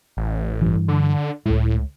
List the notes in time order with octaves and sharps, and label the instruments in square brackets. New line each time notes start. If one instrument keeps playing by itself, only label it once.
[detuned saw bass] A1
[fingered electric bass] G2 E3
[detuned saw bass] D3
[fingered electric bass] C#2 G#3 [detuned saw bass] A2